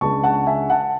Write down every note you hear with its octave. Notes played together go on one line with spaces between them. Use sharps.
C#2 C#3 G#3 D4 A5 C#6
F#5 A5
E5 G#5
F#5 A5